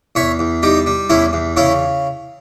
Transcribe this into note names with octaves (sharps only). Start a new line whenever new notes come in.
E2 C#5 E5
E2
G3 D#4 G4
G3
E2 C#4 E4
E2
C#3 C#4 E4